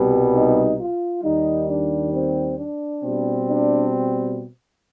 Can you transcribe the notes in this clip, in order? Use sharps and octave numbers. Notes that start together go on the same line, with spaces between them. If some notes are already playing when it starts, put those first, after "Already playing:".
Already playing: C2 B2 G3
D#4
F4
D#2 D#3 G3 D#4
D4
C4
D4
B2 G3 C4
D4